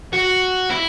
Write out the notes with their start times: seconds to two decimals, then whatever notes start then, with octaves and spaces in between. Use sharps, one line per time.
0.13 F#4
0.71 E4